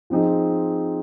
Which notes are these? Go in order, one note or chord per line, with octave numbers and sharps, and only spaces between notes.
F3 C4 D#4 G#4